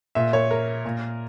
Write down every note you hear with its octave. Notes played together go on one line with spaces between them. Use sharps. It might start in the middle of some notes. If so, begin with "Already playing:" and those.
A#2 E5
C#5
A#4
A#2